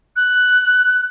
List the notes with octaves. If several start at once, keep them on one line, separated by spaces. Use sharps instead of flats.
F#6